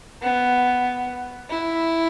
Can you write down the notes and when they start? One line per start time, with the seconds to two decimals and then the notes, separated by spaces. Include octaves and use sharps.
0.22 B3
1.50 E4